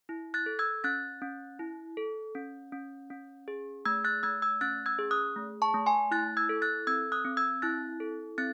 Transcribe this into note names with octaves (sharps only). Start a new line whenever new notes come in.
E4
F#6 A6
A4
E6 G#6
C#4 F#6 A6
C#4
E4
A4
C#4
C#4
C#4
G#4
A3 E6 G#6
F#6 A6
A3 E6 G#6
E6 G#6
C#4 F#6 A6
E6 G#6
G#4
D#6 F#6
A3
A5 C#6
A3
G#5 C6
E4 F#6 A6
E6 G#6
A4
F#6 A6
C4 E6 G#6
D#6 F#6
C4
E6 G#6
E4 F#6 A6
A4
C4 F#6 A6